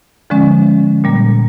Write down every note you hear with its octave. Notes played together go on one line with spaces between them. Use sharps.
D3 F3 G#3 C#4
A#2 G3 A#3